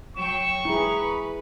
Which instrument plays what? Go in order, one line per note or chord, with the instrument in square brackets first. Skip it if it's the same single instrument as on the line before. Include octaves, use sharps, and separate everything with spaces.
[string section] F#3 G5 [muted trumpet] C#6 [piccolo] E7
[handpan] E4 G#4 [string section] B4 [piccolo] A#5